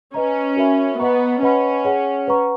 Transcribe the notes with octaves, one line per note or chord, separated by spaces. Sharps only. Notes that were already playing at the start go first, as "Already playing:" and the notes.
C#4 B4 D#5 A#5
F#4 A#4 E5 B5
B3 B4 D#5 F#5 A#5 C#6
C#4 B4 D#5 F#5 B5
G#4 C#5 F#5
B4 F#5 A#5 C#6